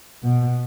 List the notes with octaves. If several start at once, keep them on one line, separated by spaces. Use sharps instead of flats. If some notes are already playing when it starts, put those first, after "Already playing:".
B2